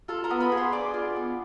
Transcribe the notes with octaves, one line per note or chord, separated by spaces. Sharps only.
F4 A4 A5
A#4 A#5
B3
B4 B5
G#4
C5 C6
D4 D5 D6
F4
B3